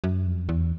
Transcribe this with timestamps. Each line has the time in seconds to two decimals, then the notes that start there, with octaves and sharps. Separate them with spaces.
0.04 F#2
0.27 F2
0.49 E2